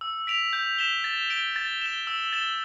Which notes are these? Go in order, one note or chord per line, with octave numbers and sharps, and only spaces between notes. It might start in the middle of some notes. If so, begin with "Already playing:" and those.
E6
B6 D7 F7
G6
B6 E7 G7
A6
D7 G7
A6
E7 G7
E6
A6 E7 G7